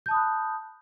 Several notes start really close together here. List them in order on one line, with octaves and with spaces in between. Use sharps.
G6 A5 D#6 B5 F#6